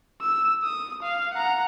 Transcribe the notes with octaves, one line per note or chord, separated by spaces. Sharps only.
E6
D#6
F5
F#5 A#5